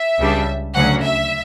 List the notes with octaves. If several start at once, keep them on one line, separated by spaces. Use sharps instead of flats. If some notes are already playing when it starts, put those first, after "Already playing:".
Already playing: E5
C#2 C#3 G3 D4
D2 C#3 F#3 C#4 F#5
E5